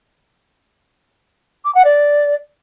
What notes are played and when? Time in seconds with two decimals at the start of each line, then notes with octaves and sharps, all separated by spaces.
1.65 D6
1.75 F#5
1.85 D5